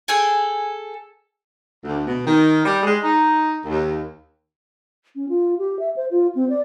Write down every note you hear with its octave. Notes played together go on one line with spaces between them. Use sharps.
G#4 A4 G5 G#5
D2
B2
D#3
G3
G#3
D#4
D#2
C#4
F4
G4
E5
C5
F4
C4
D5